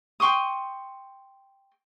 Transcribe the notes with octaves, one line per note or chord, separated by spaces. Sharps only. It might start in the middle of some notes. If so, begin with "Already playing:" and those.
G5 C6 C#6 D#6